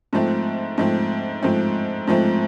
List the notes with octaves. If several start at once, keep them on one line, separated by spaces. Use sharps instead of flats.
G#2 F3 A3 C4
G#2 F3 A3 C4
G#2 F3 A3 C4
G#2 F3 A3 C4